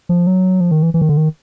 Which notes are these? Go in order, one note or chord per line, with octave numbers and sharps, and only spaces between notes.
F3
F#3
F3
D#3
E3
E3
D#3
D3
D#3